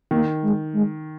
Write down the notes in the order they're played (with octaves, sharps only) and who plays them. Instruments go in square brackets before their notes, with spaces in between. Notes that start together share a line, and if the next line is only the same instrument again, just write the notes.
[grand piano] D#3 [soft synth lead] A#3
[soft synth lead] G#3
G#3